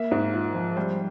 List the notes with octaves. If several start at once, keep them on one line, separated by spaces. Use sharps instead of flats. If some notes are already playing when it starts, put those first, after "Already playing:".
Already playing: A#3 E5
G#2
F4
F3
G3 C5